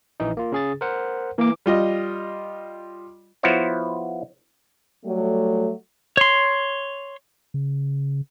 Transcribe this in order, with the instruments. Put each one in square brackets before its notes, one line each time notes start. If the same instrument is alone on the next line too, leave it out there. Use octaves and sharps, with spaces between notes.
[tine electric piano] A#1 E3 D#4
A#3 F4
C#3 G#4 A6
A#4 C5 F#5
[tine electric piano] E3 D6 [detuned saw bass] A#3
[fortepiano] G3 F4 D#5
[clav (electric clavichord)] F3 B3 E4 F#4 C5 C#5
[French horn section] F#3 G3 A3
[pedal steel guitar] C#5 C6
[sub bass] C#3